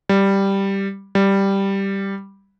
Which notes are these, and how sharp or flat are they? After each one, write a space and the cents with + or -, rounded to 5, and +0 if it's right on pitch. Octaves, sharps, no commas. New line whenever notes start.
G3 +0
G3 +0